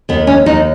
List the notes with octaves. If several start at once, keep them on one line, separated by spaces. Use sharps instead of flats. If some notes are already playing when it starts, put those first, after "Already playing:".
D#2 B3
C#4
D#2 D#4